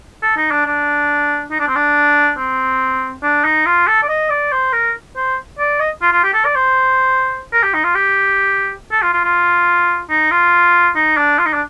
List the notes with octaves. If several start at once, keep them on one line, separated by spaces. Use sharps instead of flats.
A4
D#4
D4
D4
D#4
D4
C4
D4
C4
D4
D#4
F4
A4
D5
D#5
D5
C5
A#4
C5
D5
D#5
F4
F4
G4
A4
D5
C5
A#4
G4
D#4
F4
G4
A4
F4
F4
F4
D#4
F4
D#4
D4
F4
D#4
D4